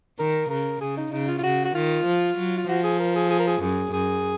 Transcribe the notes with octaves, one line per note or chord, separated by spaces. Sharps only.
D#3 A#4
C#3 A#4
C#3 G#4
D#4
C#3 D#4
F4
F4
C#3 F#4
F#4
D#3 F4
F3
F#3
F4
F3 F#4
G#4
A#4
G#4
G#4
A#4
G#4
F#2 G#4
F#2 G#4